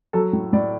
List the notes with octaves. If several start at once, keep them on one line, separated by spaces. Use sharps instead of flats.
F#3 A4
A2
A2 D5